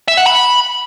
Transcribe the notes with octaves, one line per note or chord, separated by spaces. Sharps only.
E5
F#5
B5